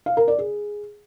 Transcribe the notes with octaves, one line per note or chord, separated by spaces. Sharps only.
F5
A#4
D5
G#4